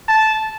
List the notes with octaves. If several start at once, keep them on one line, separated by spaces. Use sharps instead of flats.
A5